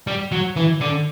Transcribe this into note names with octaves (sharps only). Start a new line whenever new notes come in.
G3
F#3
E3
D3